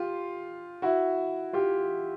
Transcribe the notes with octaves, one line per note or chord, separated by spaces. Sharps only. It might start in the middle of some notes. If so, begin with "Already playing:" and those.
Already playing: F4 G4
E4 F#4
F4 G4